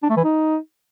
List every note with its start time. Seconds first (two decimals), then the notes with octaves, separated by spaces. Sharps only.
0.03 D4
0.10 A3
0.17 E3
0.24 D#4